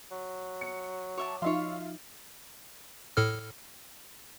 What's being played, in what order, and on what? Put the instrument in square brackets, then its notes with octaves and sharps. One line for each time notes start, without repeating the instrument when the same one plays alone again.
[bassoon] F#3
[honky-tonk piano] C#7
[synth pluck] F#4 D6 [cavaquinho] C#5 E5 A5
[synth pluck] F3 D#4 [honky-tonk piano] F4 E5 F5 [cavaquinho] C#5 C6
[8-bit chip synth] A2 A4 F6